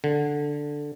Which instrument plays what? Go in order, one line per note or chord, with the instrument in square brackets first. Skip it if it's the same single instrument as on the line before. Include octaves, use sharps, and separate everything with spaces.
[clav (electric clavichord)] D3